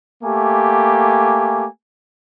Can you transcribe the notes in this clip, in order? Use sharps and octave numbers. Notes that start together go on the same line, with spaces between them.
A3 A#3 G4 G#5